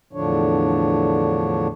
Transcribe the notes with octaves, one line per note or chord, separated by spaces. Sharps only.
E2 A2 D3 F3 D4 C#5